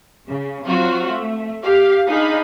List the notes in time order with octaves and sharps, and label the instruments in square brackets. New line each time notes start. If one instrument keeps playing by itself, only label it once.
[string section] C#3
F#3 C4 F4 F#4
A3
G4 F5
D4 D#4 G#4 F5 B5